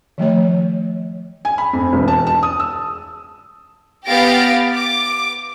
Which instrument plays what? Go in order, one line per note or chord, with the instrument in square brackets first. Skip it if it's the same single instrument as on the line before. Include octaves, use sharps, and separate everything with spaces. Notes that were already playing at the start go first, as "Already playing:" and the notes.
[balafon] D#3 F3 A3 C#5
[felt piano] G#5
B5
F2
E1
A5
A5
D#6
E6
[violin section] B3 G4 F5 A6 A#6 D7
D6